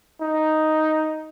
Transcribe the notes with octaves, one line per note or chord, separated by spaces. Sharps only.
D#4